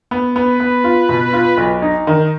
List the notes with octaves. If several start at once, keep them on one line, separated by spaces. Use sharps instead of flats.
B3
B3 B4
B3
F4
B2
F4
B1
D#4
D#3